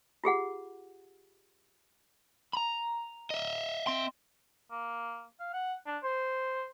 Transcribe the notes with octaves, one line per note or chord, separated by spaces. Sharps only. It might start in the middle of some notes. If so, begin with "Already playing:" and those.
F4 G4 G#4 F#5
A#5 B5
D#5 E5
C4 C6
A#3
F5
F#5
D4
C5